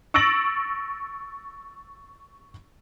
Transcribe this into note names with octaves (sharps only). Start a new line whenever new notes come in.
C#6 E6 A6 A#6 D7 F#7